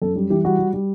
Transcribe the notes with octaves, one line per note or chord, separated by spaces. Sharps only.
F#2 A4
G3
E3 G4
G3 F#4
G3
G3